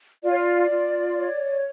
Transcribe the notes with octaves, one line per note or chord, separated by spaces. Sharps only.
F4 D5
C#5
D5
F4
C#5